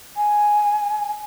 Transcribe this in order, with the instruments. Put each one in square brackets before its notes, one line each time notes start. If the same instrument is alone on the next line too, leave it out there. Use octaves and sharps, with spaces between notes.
[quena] G#5